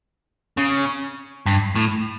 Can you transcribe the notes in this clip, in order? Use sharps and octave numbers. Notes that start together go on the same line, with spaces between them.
C#3
G2
A2